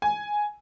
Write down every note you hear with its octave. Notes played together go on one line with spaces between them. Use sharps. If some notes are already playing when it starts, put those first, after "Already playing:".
G#5